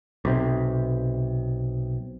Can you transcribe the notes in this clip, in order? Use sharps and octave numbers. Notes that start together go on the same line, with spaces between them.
B1 C3